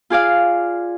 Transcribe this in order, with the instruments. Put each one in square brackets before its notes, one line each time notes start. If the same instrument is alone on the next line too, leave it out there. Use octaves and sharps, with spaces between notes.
[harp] F4 G#4 D5 F5